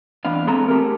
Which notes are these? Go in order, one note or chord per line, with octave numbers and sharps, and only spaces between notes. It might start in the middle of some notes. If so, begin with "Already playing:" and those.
E2 B3 D4 F5
G#3 B3 C4 A4 E5 A#5
A3 G4 G#4 A#4